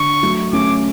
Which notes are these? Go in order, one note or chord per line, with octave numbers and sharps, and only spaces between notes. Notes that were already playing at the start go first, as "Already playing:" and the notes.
Already playing: D3 C#6
F#3 A3
A3 C#4 D6